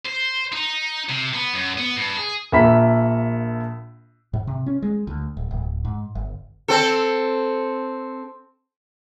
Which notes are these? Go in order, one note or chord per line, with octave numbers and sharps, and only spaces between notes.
C5
D#4
C3
B3
F#2
B3
G2
G#4
A#1 A#3 E5 B5 B6
G#2
C3
C#4
G#3
D2
D1
D1
G#2
G1
C4 A4